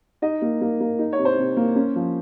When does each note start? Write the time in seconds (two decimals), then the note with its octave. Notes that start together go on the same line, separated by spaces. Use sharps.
0.22 D#4 D#5
0.42 A#3
0.61 A#3
0.81 A#3
0.99 D#4
1.13 C#5
1.18 C3
1.25 C5
1.38 C3
1.57 A#3
1.76 C#4
1.96 F3